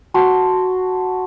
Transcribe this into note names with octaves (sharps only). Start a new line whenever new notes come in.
F#4 A5 C6